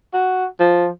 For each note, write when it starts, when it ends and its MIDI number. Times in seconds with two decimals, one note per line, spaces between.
0.13 0.45 66
0.60 0.87 53